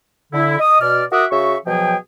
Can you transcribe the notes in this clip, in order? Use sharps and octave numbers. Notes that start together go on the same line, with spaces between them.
D3 E4
D#5 D#6
B2 D5 F6
F#4 A#4 E5 F#5 D6 D#6
C#3 F#4 E5 C#6
B2 F3 F#3 G#4 G5